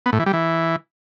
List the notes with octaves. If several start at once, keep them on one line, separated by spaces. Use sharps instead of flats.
B3
A2
E3
G3
E3